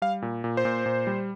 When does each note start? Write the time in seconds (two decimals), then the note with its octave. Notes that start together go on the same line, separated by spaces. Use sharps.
0.02 G3 F5
0.22 A#2
0.44 A#2
0.57 C5
0.65 A#2
0.86 A#2
1.07 G3